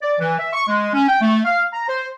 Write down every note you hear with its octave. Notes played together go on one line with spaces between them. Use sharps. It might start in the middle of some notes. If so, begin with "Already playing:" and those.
D5
E3
E5
C#6
G#3
C#4
G5
A3
F5
A#5
C5